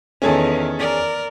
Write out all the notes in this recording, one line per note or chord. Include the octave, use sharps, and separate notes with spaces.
E2 D#3 C#4 G#4 A4
A#4 D5